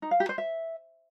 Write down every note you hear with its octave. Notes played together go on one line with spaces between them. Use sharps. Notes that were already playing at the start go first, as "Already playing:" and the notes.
D#4
F5
G4
C5
E5